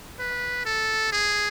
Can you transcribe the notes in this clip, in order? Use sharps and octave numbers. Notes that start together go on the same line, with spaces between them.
B4
A4
G#4